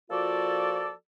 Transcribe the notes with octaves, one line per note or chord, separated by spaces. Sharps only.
F3 A#3 F4 F#4 A4 D5